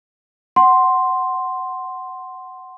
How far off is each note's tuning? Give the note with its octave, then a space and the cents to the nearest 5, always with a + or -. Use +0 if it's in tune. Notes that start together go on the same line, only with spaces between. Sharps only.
F#5 +10 C6 +0